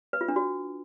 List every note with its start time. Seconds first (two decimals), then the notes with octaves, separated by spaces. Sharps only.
0.13 B4
0.21 F4
0.28 D4
0.36 F#4